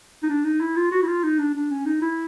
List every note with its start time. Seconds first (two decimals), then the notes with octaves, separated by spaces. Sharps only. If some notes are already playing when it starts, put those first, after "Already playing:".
0.23 D#4
0.29 D4
0.45 D#4
0.61 E4
0.76 F4
0.91 F#4
1.02 E4
1.07 F4
1.23 D#4
1.39 D4
1.55 D4
1.71 C#4
1.86 D#4
2.02 E4